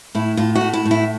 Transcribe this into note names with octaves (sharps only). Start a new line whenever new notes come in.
A2 E4
A2 F4
F#4
A3
E4
A2
E4